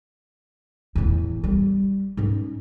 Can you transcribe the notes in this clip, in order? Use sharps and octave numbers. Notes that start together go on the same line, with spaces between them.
E2 A2
G3
G#2 C#4